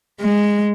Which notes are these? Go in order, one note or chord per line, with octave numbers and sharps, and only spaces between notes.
G#3